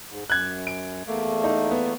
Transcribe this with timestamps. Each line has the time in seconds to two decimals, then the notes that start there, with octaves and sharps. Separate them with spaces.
0.10 G#2
0.30 F#2 F#6 G#6
0.67 D7
1.07 E2 A3 A#3
1.44 D#4
1.71 B3